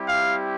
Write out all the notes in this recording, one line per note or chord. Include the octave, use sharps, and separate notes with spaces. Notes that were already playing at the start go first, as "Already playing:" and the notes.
Already playing: G3 C4 E4 G4
F5